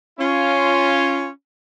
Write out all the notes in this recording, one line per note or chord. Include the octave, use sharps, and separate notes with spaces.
C#4 F4